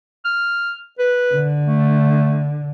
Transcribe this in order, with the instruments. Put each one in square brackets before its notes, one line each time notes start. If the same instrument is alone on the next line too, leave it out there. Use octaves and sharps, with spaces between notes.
[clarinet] F6
B4
[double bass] D3
[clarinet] A3